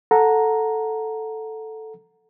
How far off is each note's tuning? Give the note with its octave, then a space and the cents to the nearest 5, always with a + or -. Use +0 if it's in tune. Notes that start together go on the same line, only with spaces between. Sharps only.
A4 +0 F#5 -15 A#5 +0